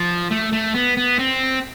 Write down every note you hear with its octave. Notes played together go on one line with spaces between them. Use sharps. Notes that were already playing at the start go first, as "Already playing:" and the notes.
Already playing: F3
A3
A3
B3
B3
C4